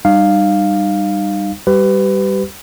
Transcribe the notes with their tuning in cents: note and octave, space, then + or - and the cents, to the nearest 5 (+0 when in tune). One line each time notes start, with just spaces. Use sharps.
G3 +0 D#4 -35 F5 +0
G3 +0 G4 -25 B4 +25